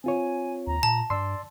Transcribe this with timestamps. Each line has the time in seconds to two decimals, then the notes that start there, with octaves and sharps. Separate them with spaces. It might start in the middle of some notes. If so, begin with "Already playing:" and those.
0.04 C4 F4 C#5 G#5
0.67 D#2 A#5
0.83 A#2 A5
1.10 G2 D5 C6 E6